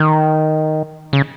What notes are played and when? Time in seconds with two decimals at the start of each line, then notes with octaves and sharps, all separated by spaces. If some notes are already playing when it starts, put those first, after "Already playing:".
Already playing: D#3
1.13 C#3